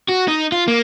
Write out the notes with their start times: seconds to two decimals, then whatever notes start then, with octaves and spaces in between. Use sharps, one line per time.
0.09 F#4
0.28 D#4
0.52 F4
0.68 A#3